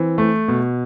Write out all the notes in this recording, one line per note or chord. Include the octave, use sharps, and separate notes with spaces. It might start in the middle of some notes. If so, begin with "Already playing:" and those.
Already playing: E3 C4
A3
B2